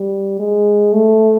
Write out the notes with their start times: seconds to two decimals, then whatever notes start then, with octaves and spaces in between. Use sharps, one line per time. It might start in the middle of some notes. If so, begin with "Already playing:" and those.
Already playing: G3
0.39 G#3
0.93 A3